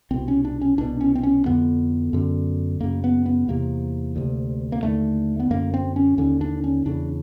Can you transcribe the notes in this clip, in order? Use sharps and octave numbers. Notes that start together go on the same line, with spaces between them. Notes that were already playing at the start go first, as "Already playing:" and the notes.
C2 B2 C4
C#4
D4
C#4
C2 B2 D4
C#4
C4
C#4
F2 D3 B3
F#2 D3
F#2 C#3 A#3
B3
B3
E2 C3 A#3
D2 C3
A#3
D#2 D3 A3
B3
F#2 D3 A#3
C4
C#4
D#2 D3 C#4
D4
C#4
E2 C#3 D4